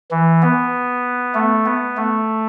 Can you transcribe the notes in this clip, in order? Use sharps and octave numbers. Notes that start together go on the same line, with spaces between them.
E3
B3
A3
B3
A3